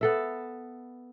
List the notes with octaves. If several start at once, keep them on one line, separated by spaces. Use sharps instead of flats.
B3 A4 E5